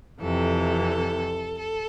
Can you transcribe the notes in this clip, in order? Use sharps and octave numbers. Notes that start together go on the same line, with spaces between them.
F2 C3 E3 A4
A4